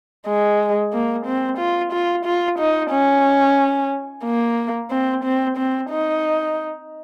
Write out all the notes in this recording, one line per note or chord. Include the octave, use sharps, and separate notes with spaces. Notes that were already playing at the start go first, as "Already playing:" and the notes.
G#3
A#3
C4
F4
F4
F4
D#4
C#4
A#3
C4
C4
C4
D#4